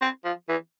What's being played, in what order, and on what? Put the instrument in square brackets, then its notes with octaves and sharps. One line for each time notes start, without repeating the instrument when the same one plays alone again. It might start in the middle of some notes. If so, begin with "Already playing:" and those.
[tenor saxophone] C4
F3
E3